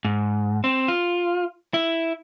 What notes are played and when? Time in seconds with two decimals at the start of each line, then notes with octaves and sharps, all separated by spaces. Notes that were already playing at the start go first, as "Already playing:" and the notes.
0.05 G#2
0.64 C4
0.88 F4
1.74 E4